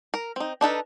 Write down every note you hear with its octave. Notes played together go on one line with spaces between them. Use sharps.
A#4
C4 D#4
D4 D#4 A4 B4